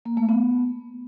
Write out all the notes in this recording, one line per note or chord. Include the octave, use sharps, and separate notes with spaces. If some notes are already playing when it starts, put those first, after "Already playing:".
A#3
A3
B3